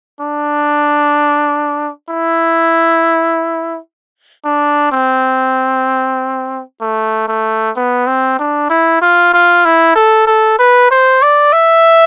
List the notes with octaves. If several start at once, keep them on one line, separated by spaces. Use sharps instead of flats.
D4
E4
D4
C4
A3
A3
B3
C4
D4
E4
F4
F4
E4
A4
A4
B4
C5
D5
E5